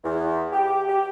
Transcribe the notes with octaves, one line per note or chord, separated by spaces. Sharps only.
E2
G4
G4